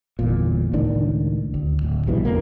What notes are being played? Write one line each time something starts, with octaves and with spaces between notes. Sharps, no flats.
G1 E2 A#2
C#2 A2 D#3 D4
D2
D1
A#1 G2 B2 E3
F2 B2 A3 A#3